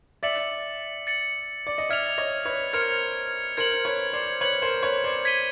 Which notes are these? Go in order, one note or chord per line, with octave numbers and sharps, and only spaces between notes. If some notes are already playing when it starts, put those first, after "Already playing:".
D5 E5 A6 C#7 F#7
A6 C#7 F#7
D5
D#5
D5 E5 F6 G#6 C#7 F7
C#5 D#5
B4 C#5
A#4 C5 F6 G#6 C#7 F7
A#4 C5 G#6 C#7 F#7
B4 C#5
C5 D5
B4 C#5 G#6 C#7 F#7
A#4 C5
B4 C#5
C5 D5
G#6 B6 D#7 G7